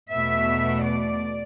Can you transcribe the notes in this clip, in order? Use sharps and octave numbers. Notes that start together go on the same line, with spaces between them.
E2 B2 A3 E5
D5